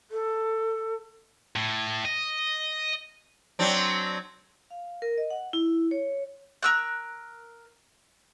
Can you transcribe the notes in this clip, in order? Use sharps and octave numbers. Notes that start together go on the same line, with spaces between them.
A4
A2
D#5
F#3 C4 D4
F5
A#4
D#5
F#5
E4
C#5
A#4 E6 F#6